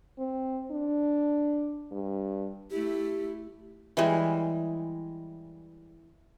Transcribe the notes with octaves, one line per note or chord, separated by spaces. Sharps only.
C4
D4
G2
A3 E4 G4
E3 G3 G#3